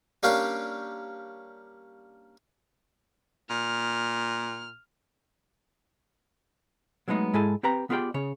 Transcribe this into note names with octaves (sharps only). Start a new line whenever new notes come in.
G3 A#3 C#4 D4 F5 G5
A#2 F6
F#3 G#3 A3 B3 D#4
G#2 G#3 E4 A4 G#5 A5
C4 G4 B4 G5 A#5
B3 F4 G4 G#4 D5 G5
C#3 C#5